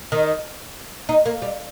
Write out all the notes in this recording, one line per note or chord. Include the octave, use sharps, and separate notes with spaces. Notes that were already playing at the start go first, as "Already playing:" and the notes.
D#3
D#4
A#3
G3